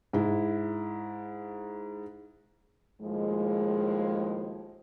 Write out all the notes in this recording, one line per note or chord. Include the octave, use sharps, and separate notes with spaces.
G#2 E4
D#2 A2 F3 G#3